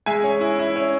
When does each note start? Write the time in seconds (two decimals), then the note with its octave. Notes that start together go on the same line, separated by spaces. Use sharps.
0.06 G#3 E5 G#5
0.24 C#4
0.41 E4
0.59 E4
0.76 C#4